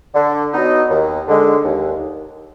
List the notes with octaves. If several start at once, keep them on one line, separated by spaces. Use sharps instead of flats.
D3
F#3 B3 D#4
D#2
D3 G#3
D#2